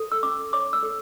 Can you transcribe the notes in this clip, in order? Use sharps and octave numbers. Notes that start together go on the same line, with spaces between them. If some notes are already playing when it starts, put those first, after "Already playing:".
Already playing: A4
E6
C#4 D6
C#5 D6
E6
A4